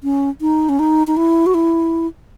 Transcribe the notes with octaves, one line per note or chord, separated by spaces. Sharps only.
C#4
D#4
C#4
D#4
D#4
E4
F#4
E4